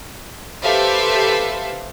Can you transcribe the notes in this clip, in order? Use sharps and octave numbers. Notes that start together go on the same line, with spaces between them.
G4 A4 B4 C5 E5 F5